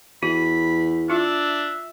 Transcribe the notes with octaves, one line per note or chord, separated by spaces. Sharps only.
E2 F#4 B5
D4 F4 E5